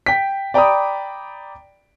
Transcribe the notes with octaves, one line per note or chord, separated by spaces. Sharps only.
G5 B6
D5 G5 A#5 B5 D6 D#6